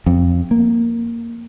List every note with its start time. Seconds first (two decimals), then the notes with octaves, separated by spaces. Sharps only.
0.06 F2
0.51 A#3